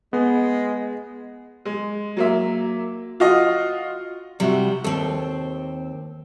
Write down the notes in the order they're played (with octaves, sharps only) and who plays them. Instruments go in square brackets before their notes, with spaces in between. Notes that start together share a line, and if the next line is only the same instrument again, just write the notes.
[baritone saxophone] G#3 [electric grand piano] B3
[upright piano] G#3
F#3 A#3 E5
F4 F#4 D#5
[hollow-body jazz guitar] C3 E4 F#4 [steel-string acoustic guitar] G3
[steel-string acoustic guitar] D#2 C4 [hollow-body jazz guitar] A4